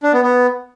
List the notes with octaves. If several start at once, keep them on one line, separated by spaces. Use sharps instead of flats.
D4
B3
B3